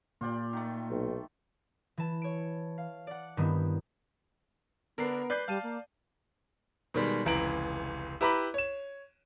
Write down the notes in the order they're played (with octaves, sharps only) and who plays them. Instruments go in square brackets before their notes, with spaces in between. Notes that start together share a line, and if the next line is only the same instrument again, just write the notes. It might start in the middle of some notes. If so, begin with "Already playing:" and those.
[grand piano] A#2 [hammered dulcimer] F4 G4 D5
[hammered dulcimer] D#3 A3
[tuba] B1
[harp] E3 A5
C#5 D7
F5
D5 F#5
G2 D#3 B3 C4 E4
[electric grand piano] D3 D4 C7 [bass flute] B3 [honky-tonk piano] A#4
[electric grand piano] B4 [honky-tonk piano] D5 G6 C7
[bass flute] G3 [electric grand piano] F5 A5 D#7
[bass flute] A#3
[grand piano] B2 D#3 G3 G#3
F1 C#2 E3 A#5 D7 F#7
E4 G4 B4 A#5 B5 D6
C#5 E7